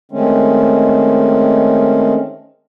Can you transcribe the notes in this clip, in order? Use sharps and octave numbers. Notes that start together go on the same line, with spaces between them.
D#3 G#3 A3 C4 C#4